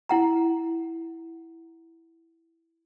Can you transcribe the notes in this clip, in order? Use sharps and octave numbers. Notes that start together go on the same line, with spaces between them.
E4 F#5 A#5